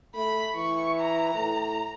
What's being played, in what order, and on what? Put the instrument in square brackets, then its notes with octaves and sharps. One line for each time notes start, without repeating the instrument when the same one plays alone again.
[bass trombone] A3 [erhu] B5
[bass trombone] E3 [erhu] C#6
[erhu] A#5
[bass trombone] A2